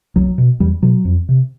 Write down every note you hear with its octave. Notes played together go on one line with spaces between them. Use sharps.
C2 F#3
B2
E2 G3
B2 F#3
F2
C3